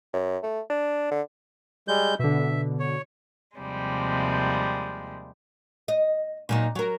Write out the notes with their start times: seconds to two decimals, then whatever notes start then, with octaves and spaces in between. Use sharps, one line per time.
0.13 F#2
0.43 A3
0.70 D4
1.11 D3
1.88 G3 G#3 G6
2.19 B2 D3 E5
2.79 C#5
3.59 D#2 C3 F3 G3 G#3
5.88 D#5
6.49 A#2 F#3 D#4
6.75 F#3 A#4